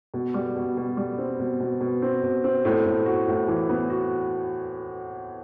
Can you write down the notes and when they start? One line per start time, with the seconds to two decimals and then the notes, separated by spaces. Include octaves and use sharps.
0.14 B2
0.34 G3
0.56 B2
0.77 B2
0.97 G3
1.18 C4
1.39 B2
1.60 B2
1.81 B2
2.02 C4
2.23 B2
2.44 C4
2.65 A2
2.85 A2
3.06 F#4
3.28 A2
3.48 E3
3.69 B3
3.90 F#4